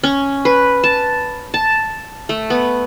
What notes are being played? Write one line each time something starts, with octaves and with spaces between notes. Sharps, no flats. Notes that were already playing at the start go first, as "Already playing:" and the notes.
C#4
B4
A5
A5
A3
B3